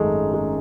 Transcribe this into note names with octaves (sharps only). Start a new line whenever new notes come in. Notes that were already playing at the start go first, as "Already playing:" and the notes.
Already playing: G#1 F#2 D#3 G#3 A3 D#4
G#3